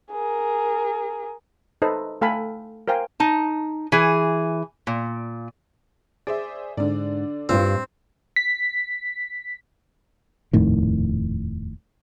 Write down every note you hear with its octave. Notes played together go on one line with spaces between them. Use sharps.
G#4 A#4
D#4 A4 B4 C5 D#5
A3 A4 F5 G5 G#5 B5
A#4 C5 F5 G5 G#5
D#4 A5
E3 G#4
A#2
G#4 C5 D5 E5
G#2 D3 D5
E2 G2 C4 F4
B6
D#1 F2 A2 D#3